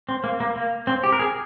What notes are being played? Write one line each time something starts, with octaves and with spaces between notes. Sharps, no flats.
C4
A#3
A#3
A#3
C4
G4
A#4
G#4